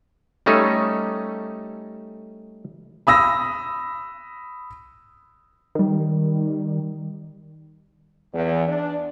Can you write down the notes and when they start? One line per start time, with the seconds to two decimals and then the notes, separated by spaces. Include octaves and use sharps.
0.46 G3 A3 C#4 D#4 A4
3.07 B5 D#6 E6 A#6
5.75 D#3 G3
8.33 E2
8.68 D4